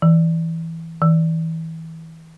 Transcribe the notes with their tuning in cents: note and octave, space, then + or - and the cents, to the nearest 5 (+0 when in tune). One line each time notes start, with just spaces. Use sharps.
E3 -10
E3 -30